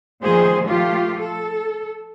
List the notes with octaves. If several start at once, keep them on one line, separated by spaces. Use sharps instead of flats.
A#2 D#3 F3 A3 G#4 C5
F3 A3 F4 G4
A4